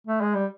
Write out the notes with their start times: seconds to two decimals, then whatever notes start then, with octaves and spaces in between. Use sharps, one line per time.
0.07 A3
0.21 G#3
0.35 G3